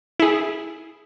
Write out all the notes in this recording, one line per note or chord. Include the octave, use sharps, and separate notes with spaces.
E4 G#4